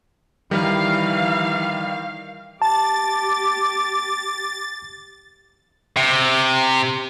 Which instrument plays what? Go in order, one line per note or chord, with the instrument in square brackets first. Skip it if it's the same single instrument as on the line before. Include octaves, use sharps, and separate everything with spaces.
[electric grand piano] D#3 G3 [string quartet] E3 [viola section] F5
[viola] G4 D6 [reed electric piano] A5 [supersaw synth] A6
[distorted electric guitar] C3